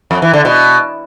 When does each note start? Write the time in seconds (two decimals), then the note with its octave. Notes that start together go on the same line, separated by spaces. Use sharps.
0.11 F2
0.22 E3
0.34 D3
0.45 B2